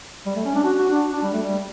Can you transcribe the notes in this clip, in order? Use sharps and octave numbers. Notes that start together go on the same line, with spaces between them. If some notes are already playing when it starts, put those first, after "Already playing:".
G3
A3
C#4
D4
F#4
F#4
D4
D4
G3
A3
G3